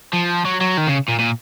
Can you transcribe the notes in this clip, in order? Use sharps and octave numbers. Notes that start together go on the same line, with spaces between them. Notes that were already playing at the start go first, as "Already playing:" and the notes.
F3
F#3
F#3
D#3
C#3
A#2
A#2